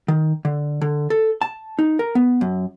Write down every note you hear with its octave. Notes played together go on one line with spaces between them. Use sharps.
D#3
D3
D3
A4
A5
D#4
A#4
B3
F#2